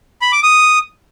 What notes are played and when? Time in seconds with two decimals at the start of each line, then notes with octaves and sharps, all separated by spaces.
0.22 B5
0.32 D6
0.43 D#6